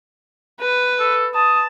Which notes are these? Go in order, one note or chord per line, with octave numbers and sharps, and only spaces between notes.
B4
A4
A5 D#6